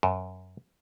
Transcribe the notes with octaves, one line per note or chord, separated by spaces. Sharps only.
F#2